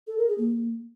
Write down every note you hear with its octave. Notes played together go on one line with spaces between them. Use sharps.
A4
A#4
G#4
A#3